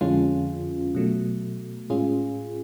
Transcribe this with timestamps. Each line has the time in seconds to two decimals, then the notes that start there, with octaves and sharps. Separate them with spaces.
0.01 F2 D3 G#3 C#4 F4
0.95 B2 F#3 A3
1.90 A2 G#3 C#4 F4 G#4